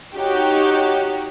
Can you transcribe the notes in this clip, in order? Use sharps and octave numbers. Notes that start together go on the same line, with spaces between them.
D#4 F#4 G4 C#5